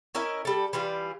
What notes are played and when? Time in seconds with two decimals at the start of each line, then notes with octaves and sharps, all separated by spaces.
0.15 C#4 E4 A#4 D#5
0.45 G3 A4
0.73 E3 G3 F4